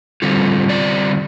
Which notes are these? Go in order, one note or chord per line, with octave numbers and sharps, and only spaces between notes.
D3 G3 C4 F4 A4
D5